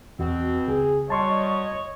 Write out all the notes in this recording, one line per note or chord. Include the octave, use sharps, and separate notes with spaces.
E2 B2 C4 F#4
C#2 G#4
F#3 G3 C#5 D#5 A5 C6 C#6